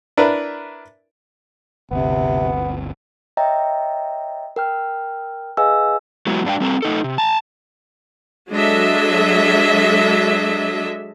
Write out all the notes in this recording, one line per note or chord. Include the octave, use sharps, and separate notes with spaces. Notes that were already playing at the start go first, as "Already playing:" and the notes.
D4 E4 A#4 B4
G1 D2 C3 B3 C4
C#5 D#5 E5 G5 A#5
A#4 G5 F6
G#4 B4 D#5 F5 G#5 E6
F#3 G#3 B3 E4 F#4
G#2 D4 F5 G5
G3 C4 A4 A#5
A3 D#4 A4
C3
A5 A#5
F#3 G#3 D4 A4 D#5 E5